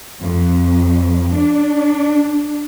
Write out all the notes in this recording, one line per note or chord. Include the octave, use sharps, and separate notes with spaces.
F2
D4